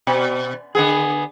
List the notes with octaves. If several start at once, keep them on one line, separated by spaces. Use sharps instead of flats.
B2
D3 B3 G#4